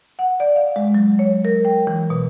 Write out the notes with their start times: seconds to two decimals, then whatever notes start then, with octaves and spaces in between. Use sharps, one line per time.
0.19 F#5
0.40 D5
0.56 F5
0.76 G#3
0.95 F#3
1.19 C#5
1.45 A#4
1.65 G5
1.87 E3
2.10 B2